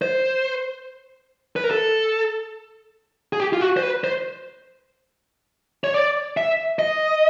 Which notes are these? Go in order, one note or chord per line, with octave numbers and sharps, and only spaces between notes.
C5
B4
A#4
A4
G#4
G4
F4
F#4
C5
B4
C5
C#5
D5
E5
D#5